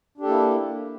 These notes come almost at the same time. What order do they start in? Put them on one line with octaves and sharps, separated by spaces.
D4 G4 A4 A#3 E4